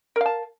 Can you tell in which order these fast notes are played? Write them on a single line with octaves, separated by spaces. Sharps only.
A#4 F5 A5